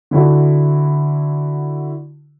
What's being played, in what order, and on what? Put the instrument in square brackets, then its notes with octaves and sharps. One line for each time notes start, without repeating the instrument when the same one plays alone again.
[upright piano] D3 E4 F#4